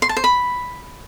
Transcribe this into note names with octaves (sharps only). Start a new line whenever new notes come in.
C6
A5
C5
B5